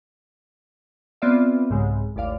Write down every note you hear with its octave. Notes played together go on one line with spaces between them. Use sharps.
B3 C4 F4 D5 E5
C2 G#2 C#3 G#3
A1 D#2 D5 F5